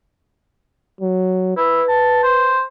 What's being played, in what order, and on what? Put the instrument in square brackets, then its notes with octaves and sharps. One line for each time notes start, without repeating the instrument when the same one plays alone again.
[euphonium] F#3
[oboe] E4 [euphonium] B4
[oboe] A5
C5